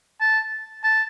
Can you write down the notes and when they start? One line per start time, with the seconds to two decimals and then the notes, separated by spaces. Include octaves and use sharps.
0.21 A5
0.84 A5